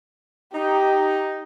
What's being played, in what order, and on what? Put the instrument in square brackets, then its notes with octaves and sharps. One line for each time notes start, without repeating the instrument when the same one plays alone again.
[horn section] D#4 [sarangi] G4